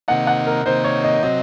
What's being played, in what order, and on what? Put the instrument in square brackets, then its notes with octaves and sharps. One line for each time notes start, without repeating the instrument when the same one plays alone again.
[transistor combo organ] C3 D#3 A#3 D#4 [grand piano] F#5
[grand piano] F#5
A#4
[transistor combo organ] C3 D#3 A#3 D#4 [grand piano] C5
[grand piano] C#5
D#5
[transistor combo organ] C3 F#3 C4 [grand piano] D#5